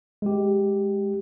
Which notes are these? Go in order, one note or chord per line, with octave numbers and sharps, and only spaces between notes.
G#3 G4